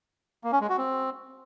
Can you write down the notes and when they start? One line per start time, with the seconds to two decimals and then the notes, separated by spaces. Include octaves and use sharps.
0.44 A#3
0.52 C#4
0.61 G#3
0.69 F#4
0.78 C4